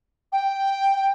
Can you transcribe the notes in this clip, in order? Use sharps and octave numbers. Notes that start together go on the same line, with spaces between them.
G5